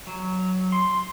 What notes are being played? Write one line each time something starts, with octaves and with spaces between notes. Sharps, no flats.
F#3
C6